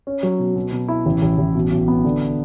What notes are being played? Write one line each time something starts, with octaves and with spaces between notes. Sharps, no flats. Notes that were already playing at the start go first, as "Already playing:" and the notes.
C#4
F#3
B2
B2
B2
E4
A1
A1
A1
B2
B1
B3
D3